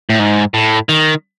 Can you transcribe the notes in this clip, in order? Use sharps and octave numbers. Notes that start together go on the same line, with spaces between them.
A2
G#2
A2
D#3